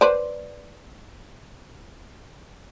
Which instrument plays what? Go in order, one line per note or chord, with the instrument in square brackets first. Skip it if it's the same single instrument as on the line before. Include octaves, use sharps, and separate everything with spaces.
[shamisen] B4 C5 D5